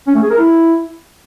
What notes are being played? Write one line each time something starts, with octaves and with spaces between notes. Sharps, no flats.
C#4
A3
G#4
A#4
E4